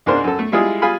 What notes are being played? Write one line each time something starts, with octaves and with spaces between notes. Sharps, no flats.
C#2 G#2 D4 A#4 C5
F#2 A4
A3
G3 G#3 E4 F4 G#4
G3 F4 G#4 F5 G#5 B5